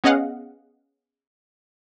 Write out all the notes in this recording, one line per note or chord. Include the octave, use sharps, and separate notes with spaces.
B3 C#4 G#4 D#5 F5 F#5